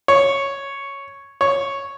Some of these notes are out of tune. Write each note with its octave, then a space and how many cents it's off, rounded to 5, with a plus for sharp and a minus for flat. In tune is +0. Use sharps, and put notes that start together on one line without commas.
C#5 +0
C#5 +0